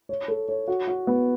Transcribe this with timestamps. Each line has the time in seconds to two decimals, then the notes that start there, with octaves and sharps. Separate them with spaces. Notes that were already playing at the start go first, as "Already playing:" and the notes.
0.09 C#5
0.28 A4
0.49 C#5
0.68 F#4
0.87 F#4
1.07 B3